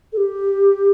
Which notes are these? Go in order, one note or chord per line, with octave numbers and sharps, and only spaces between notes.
A4
G4